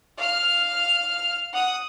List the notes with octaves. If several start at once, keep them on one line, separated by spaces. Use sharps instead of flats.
F5 F6
F#5 D#6